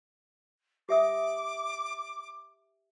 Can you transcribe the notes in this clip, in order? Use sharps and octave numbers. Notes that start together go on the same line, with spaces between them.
G4 E5 D6 D#6